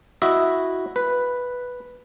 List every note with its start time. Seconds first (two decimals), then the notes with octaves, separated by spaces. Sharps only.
0.22 E4 F#4 D#5 E5
0.96 B4